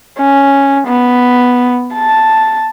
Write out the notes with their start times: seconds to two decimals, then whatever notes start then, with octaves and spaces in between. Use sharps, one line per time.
0.18 C#4
0.87 B3
1.94 A5